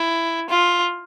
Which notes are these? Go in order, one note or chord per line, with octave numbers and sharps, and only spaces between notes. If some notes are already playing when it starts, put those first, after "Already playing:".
Already playing: E4
F4